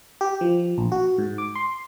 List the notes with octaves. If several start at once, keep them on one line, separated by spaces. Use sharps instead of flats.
G4
F3
A#1
F#4
G#2
D6
C6